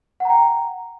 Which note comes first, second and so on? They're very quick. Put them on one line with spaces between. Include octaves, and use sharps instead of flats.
F#5 A#5 G5